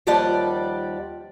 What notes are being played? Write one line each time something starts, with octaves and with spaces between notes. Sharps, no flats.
D#2 F3 G3 D5 F#5 A5